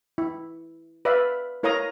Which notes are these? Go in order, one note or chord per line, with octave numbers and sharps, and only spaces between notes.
E4
B4 D5 E5 F5 B5
E4 A#4 C#5 F5 A#5 D#6